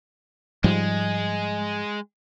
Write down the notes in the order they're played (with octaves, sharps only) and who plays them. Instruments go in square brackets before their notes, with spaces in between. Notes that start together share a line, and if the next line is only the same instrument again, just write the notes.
[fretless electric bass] G#2 F3 G3 [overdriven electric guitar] G#3